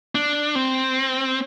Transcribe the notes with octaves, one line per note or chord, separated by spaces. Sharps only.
D4
C4